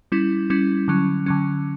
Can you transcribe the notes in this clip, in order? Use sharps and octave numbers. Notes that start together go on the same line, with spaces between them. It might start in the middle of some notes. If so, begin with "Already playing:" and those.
G3 C#4 E4
G3 C#4 E4
D3 F#3 C#4
D3 F#3 C#4